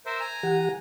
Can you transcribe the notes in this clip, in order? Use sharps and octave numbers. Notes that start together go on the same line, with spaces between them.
A#4 C5 E5
G#5 A#5
E3 G4 F#5